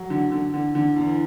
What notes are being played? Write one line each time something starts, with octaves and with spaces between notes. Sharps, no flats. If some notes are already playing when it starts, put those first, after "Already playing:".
Already playing: F#3
D3
D3
D3
D3
E2